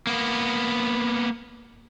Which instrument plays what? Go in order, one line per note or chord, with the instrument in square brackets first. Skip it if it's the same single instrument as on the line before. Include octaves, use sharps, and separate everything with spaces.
[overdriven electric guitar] A#3 B3